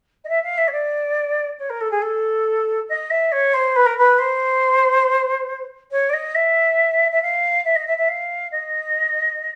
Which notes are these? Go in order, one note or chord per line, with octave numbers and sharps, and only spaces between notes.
D#5
E5
F5
E5
C#5
D5
C#5
A#4
A4
G#4
A4
D#5
E5
C#5
C5
B4
A#4
B4
C5
C#5
D5
D#5
E5
E5
F5
E5
D#5
E5
E5
F5
D#5